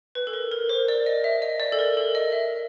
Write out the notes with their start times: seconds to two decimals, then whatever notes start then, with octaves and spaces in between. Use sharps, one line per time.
0.15 B4
0.27 A4
0.33 A#4
0.52 A#4
0.69 C5
0.88 D5
1.06 D#5
1.24 E5
1.42 D#5
1.60 D5
1.72 A4
1.79 A#4
1.97 A4
2.15 D#5
2.32 E5